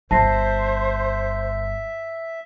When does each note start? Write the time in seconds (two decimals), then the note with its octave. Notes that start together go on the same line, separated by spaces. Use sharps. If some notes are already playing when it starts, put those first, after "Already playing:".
0.11 G1 C5 E5 A5 A#6 C7